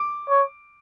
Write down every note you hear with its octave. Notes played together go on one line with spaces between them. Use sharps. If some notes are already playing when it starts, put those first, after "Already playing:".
Already playing: D6
C#5